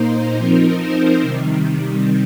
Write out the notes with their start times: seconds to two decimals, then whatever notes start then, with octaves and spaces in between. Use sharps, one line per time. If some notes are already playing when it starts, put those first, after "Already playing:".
Already playing: A#2 A#3 D#4 C5
0.38 F3 C4 D#4 A#4
0.80 C5
1.22 C3 D#3 G3